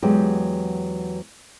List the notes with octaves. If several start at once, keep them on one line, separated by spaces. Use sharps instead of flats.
E2 F#3 G#3 G4